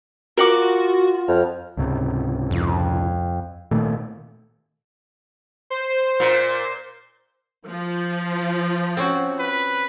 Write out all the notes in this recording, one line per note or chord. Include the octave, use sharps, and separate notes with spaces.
F4 F#4 A#4 F#5 D6
F2 F6
C#2 G#2 C3
F2
A#2 D#3 A3
C5
A#2
F3
C4 C#4 F#4
B4